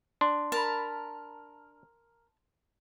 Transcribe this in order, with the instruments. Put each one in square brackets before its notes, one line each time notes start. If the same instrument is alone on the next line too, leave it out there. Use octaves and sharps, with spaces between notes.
[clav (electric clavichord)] D4 [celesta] C6
[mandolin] A#4 B5 [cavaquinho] A5